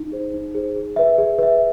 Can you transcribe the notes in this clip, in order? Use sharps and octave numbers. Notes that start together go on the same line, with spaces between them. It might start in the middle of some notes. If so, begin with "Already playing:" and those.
Already playing: D#4
G#4 C5
D#4
G#4 C5
G#4
B4 E5
G#4
B4 E5